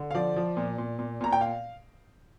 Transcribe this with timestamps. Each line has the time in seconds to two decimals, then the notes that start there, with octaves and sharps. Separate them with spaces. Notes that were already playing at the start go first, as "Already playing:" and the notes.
Already playing: D3
0.11 F5
0.15 F3 D5
0.36 F3
0.57 A#2
0.78 A#2
0.99 A#2
1.21 A#2 A#5
1.33 G5
1.41 F5